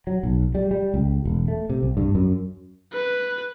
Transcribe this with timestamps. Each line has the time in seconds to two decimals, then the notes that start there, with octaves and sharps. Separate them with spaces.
0.07 F#3
0.23 B1
0.55 G3
0.71 G3
0.94 C#2
1.25 E1
1.48 A3
1.70 C3
1.83 C2
1.97 G2
2.15 F#2
2.93 B4